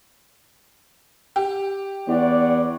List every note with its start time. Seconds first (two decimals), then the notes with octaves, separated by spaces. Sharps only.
1.36 G4
2.08 E2 C#5 D5 F#5